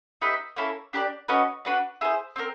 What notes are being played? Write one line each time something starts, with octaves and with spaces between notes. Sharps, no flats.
D#4 G4 B4 E5
A#3 C#4 E4 A4
D4 G4 A#4 D5
C#4 F#4 B4 D#5
D4 F#4 B4 D5
E4 G#4 C5
C4 F4 A#4